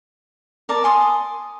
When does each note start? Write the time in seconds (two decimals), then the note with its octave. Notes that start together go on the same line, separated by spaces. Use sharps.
0.69 A#4 D5 A5
0.84 G#5 C6 D#6